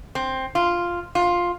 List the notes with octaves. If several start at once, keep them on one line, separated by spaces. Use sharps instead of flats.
C4
F4
F4